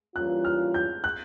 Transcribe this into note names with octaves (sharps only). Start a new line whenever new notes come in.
E3 G3 A#3 C#4 F4 F#6
F6
G6
F#6